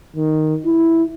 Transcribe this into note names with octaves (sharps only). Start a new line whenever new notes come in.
D#3
E4